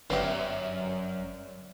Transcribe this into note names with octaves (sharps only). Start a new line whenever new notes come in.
G1 F#2 B3 C#4 D4 G4 E5